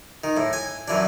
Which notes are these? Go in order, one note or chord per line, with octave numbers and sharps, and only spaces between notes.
D#3
A2
G#5
F#2 E3 D4